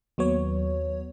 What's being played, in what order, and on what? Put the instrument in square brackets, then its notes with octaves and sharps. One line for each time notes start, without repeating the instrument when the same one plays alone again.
[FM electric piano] D#2 F#3 B3 C#5